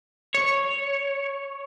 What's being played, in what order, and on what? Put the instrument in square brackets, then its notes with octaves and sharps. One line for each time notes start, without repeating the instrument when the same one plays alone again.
[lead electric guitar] C#5